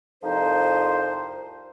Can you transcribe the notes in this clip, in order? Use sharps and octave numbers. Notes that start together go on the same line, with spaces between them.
C2 F2 F3 D#4 C5